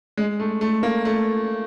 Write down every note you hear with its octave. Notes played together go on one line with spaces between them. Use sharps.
G#3
A3
A3
A#3
A3